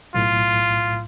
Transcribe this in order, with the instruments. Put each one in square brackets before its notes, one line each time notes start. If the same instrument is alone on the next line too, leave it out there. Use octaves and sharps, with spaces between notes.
[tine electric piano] B1 A2 [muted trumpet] F4